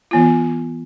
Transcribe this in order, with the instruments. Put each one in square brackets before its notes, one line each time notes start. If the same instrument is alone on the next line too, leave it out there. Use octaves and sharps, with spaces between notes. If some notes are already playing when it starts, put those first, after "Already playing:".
[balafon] E3 B3 F4